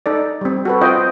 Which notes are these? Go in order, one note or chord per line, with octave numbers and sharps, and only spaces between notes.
D#4 A4 D5
G3 C4
F#4 A4 B4
C4 F4 C5 D#5 G5